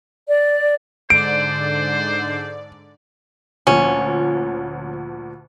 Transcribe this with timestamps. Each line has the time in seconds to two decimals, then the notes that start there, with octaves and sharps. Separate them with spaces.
0.27 D5
1.10 G#2 D3 C5 D5 D7
3.67 D2 A#2 F3 C#4